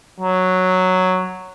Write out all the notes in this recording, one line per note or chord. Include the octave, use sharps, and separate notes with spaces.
F#3